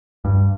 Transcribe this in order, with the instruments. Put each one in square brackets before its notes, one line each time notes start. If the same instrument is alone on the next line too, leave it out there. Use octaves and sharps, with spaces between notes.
[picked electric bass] G2